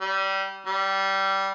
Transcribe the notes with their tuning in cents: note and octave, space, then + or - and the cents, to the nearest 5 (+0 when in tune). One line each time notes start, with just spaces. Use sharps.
G3 -20
G3 -15